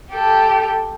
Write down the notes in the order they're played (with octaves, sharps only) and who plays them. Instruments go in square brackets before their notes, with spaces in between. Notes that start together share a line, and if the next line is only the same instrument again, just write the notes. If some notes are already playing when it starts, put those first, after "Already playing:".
[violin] G4 A4